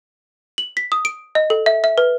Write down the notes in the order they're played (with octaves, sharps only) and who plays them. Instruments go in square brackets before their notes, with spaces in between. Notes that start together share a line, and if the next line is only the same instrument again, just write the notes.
[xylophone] F#7
B6
D#6
D7
D#5
A4
E5
E5
B4